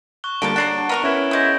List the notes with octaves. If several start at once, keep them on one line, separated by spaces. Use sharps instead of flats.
C#6 F#6 G7
D3 F3 G3 A#3 A#4 A5 D7
D3 F#3 D4 F#4 F#6 C7
B3 F#4 A#4 C#6
C#4 E4 A#4 B4
G#3 B3 D#6 G6 A#6